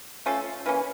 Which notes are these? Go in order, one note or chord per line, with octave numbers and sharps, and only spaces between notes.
A3 C#4 F4 A4
E3 A#3 C#4